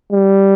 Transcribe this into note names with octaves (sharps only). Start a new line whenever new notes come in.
G3